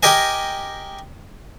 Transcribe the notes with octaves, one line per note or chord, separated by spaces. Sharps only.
G4 A#4 D#5 G#5